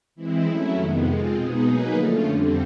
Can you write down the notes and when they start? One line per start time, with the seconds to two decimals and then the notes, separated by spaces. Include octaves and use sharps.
0.15 E3 G#3 C4 E4
0.44 F#3 A3 C#4 E4
0.74 F2 C3 D#3 G#3 B3
1.04 G#3 C4 F4
1.34 B2 G#3 B3 D#4 G#4
1.63 F#3 A#3 D#4 G#4 B4
1.92 D3 F3 A3 C#4 F4
2.22 F2 D3 G3 C4